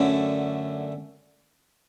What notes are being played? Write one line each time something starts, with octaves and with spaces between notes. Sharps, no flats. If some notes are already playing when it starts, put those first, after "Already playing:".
Already playing: F#2 D3 A3 C#4